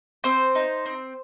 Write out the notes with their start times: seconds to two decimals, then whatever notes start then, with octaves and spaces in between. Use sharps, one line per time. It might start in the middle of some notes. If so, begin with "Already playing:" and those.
0.24 C4 C5
0.55 D#4
0.86 C4